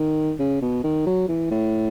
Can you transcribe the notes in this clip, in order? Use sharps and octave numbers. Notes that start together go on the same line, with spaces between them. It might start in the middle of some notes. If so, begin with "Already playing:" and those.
Already playing: D#3
C#3
B2
D#3
F#3
E3
A2